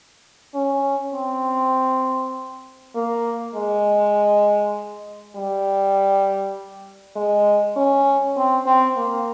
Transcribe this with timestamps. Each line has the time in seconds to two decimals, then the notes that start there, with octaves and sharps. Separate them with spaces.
0.54 C#4
1.14 C4
2.95 A#3
3.55 G#3
5.36 G3
7.16 G#3
7.76 C#4
8.37 C4
8.66 C4
8.97 A#3